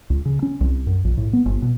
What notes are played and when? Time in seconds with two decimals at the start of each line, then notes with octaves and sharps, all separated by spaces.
0.10 C#2
0.25 C#3
0.42 C#4
0.61 C2
0.87 F#2
1.04 A#1
1.18 A2
1.33 B3
1.46 G1
1.62 B2